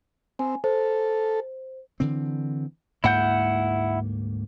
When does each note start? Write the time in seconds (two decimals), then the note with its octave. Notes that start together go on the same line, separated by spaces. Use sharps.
0.39 C4 G#5
0.64 A4 C5
2.00 D3 E3 C4
3.04 D2 G#2 A#3 E4 F#5 G6